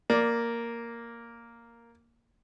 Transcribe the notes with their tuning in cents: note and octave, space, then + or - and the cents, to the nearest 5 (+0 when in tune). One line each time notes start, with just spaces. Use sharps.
A#3 +0 D5 +0